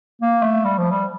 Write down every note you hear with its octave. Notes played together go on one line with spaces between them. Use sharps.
A#3
A3
G3
F3
G3